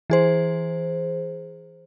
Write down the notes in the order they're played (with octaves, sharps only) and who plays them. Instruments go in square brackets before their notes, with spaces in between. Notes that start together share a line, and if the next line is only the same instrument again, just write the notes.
[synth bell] E3 G#4 C5